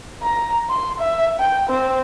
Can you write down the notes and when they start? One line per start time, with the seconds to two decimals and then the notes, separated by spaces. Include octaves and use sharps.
0.22 A#5
0.69 C6
1.00 E5
1.39 G5
1.69 C4